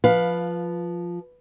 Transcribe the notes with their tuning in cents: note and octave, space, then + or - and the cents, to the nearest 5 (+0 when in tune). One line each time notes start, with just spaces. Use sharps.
F3 +0 B4 +0 F5 +15